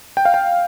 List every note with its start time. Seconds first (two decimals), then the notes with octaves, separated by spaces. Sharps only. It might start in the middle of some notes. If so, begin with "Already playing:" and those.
0.17 G5
0.25 F5
0.34 G5